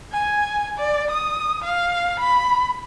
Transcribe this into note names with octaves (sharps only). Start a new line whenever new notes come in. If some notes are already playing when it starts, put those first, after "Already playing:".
G#5
D5
D#6
F5
B5